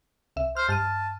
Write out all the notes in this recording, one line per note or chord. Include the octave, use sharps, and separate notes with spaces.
C2 E5
C5 F6
G2 A5 F6 D#7